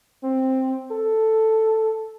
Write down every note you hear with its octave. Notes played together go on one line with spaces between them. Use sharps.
C4
A4